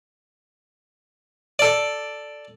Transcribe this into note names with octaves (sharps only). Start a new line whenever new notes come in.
A4 D5